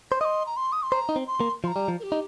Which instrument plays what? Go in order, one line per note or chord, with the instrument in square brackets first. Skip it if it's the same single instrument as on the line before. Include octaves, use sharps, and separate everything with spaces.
[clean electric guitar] C5
[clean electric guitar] D#5 [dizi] D#6
[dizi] C6
A#5
C6
D#6
C6
[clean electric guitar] C5 [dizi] A#5
[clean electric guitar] D#4
C4
[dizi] C6
[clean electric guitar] A#3
[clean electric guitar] F3 [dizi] C6
[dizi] A#5
[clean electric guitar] G3
F3
[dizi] A#4
G4
[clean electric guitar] D#4